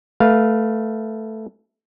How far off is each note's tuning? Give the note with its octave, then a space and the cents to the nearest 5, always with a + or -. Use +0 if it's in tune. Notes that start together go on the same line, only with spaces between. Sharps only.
A3 +0 B4 -15 F5 +0